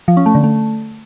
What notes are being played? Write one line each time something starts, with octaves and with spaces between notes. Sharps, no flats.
F3
C#4
A3
D3
A3